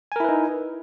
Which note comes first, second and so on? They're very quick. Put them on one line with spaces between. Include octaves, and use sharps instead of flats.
G#5 A#4 E4 B4 D#4